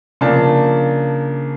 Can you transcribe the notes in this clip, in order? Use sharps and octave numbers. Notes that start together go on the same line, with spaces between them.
C#3 F3 A#3 D4 A5